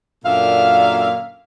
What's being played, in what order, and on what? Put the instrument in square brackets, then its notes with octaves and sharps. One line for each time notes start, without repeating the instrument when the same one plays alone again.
[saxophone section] F#2 A#2 D3 A#3 E5 F5